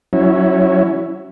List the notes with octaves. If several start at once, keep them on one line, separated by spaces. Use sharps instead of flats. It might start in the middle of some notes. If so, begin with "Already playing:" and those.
F#3 C#4 E4